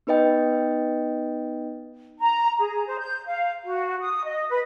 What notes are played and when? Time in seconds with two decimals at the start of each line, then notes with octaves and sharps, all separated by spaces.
0.07 B3 D#4 B4 D#5 G5
2.19 A#5
2.58 G#4
2.86 C5
2.99 G6
3.26 F5
3.66 F#4
4.00 D#6
4.26 D#5
4.49 B4